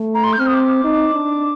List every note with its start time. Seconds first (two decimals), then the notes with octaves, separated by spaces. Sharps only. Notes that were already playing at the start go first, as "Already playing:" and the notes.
Already playing: A3
0.14 A#5
0.24 C6
0.33 G6
0.39 C4 F6
0.47 D#6
0.54 D6
0.84 D#4
1.15 D4